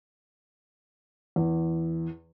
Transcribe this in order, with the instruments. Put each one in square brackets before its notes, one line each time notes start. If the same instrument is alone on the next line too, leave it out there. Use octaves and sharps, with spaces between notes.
[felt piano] E2